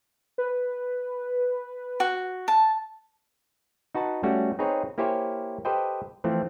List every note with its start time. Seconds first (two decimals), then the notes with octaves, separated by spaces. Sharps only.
0.38 B4
2.00 F#4
2.48 A5
3.95 D#4 F#4 B4 A5
4.23 G3 A3 C#4 F#4
4.59 C4 D#4 G#4 B4 C#5
4.98 A#3 E4 G4 C5 C#5 G#5
5.65 G4 A4 B4 C5 D#5 G5
6.24 E3 F3 A3 C4